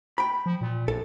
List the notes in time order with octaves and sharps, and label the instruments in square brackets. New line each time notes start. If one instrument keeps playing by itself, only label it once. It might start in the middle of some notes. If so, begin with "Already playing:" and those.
[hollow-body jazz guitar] G5 B5
[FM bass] F3
A#2
[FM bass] A#1 [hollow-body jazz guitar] A4